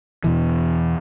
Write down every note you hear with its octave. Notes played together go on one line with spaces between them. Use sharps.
E2 B2 E3